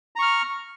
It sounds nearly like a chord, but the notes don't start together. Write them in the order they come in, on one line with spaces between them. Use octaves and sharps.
A#5 C#6 F6